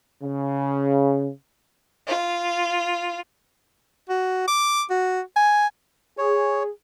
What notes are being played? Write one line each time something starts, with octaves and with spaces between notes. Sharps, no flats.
C#3
F4
F#4
D6
F#4
G#5
G#4 C#5